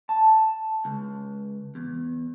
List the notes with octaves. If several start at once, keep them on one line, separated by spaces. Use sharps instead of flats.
A5
C#2
E2